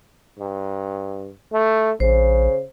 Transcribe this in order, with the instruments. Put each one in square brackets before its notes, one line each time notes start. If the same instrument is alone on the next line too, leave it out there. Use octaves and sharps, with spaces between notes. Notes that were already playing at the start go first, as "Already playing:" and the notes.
[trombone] G2
A3
[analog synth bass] A#1 [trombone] C#3 [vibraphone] C5